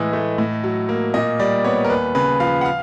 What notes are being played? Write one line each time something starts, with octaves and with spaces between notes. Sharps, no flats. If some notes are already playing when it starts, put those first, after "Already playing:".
Already playing: A2 E3 G#3 D#5
A3
A2
F#3
A#3
A#2 D#5
G3 D5
B3 C#5
A#4
D#2 B4
C#3 B4
F3 F5
F#5
F5